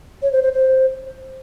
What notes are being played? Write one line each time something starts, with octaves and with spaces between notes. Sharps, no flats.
C#5
C5
C5
C5